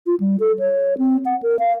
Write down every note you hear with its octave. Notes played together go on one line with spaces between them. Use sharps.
F4
G3
A4
C#5
C4
F#5
A#4
F5